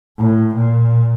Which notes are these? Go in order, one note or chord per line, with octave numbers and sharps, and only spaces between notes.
A2
A#2